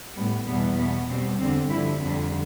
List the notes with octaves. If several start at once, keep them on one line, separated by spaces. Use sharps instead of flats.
A2 G3 B3
E2 B2 G3 B3
B2 G3 B3
B2 G3 C4
E2 D3 G3 C4
G2 D3 F3 E4
F2 D3 G3